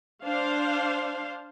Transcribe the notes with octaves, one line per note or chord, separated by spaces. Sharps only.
D4 C5 F5